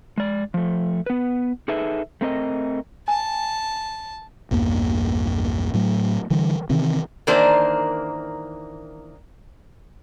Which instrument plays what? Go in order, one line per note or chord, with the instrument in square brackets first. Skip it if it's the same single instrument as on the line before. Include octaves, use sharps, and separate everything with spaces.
[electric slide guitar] G#3 D5
F3 A3
B3 B4
D#4 G#4 A4 B4 E5
A3 C4 A#4 D#5
[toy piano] G#5 [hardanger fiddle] A5
[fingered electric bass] A#1 E2 G2 A#3
A2 F#3 A3
D3 E3 G3
C3 D#3 E3 C4
[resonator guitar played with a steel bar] D#3 E3 A#3 D4 A#4 C5